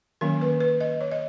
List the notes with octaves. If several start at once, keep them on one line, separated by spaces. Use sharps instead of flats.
D#3 F#3 A#3 C#4 A#4
B4
B4
D#5
C#5
D#5